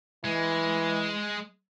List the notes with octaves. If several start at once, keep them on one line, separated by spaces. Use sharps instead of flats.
E3 G#3